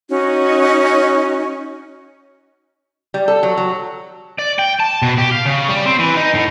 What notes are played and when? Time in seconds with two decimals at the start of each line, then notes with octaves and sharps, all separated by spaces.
0.10 C#4 D#4 F#4 D#5
3.14 G3
3.28 A4
3.43 F#3
3.57 F#3
4.39 D5
4.59 G5
4.80 A5
5.02 B2
5.18 G4
5.31 F5
5.46 C#3
5.69 G3
5.86 C4
5.99 E3
6.17 D#4
6.35 A2